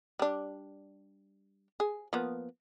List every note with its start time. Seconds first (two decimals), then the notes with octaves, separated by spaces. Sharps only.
0.19 G3 D4
1.80 G#4
2.13 F3 A#3 B3